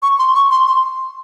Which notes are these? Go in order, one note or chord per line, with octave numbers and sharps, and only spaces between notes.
C#6
C6
C#6
C6
C6